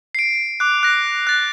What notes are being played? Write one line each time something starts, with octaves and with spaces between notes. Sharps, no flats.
C7 D7
D6 F#6
F#6 A#6
F#6 A6